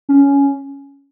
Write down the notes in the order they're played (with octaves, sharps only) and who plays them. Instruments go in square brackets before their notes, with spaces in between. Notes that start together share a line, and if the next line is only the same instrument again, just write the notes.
[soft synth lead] C#4